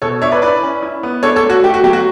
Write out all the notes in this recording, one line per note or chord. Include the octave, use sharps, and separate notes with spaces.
B2 A4 C#5
D4 C#5 E5
B4 D5
E4 B4 D5
C#4
E4
B3
D4 A4 C#5
A4 C#5
A3
F#4
A3 G4
F#4
F#3 G4
F#4